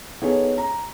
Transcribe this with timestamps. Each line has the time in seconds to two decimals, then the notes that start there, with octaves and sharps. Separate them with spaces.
0.22 B3 D#4 G#4 A4 C#5
0.58 A#5